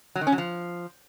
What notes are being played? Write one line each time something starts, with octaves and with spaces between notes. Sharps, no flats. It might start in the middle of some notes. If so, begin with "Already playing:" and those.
F#3
D#3
C#4
F#3
F3